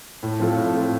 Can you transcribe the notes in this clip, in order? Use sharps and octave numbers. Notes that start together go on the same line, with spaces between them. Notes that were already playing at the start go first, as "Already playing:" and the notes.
A2
F3 C4 F4 A4
A2
F3 C4 F4 A4